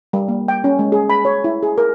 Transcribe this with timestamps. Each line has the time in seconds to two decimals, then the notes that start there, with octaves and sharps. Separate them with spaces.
0.13 G3
0.28 A#3
0.48 G5
0.64 C#4
0.79 G#3
0.92 G#4
1.10 B5
1.25 C#5
1.44 E4
1.63 G#4
1.78 A#4